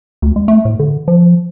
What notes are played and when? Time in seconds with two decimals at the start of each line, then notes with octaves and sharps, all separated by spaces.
0.22 D2
0.36 G#3
0.48 A3
0.65 A2
0.79 D3
1.08 F3